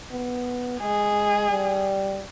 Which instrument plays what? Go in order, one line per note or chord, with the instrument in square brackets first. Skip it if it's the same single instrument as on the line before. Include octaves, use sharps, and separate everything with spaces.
[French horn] B3
[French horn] G#3 [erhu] G#4
[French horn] G3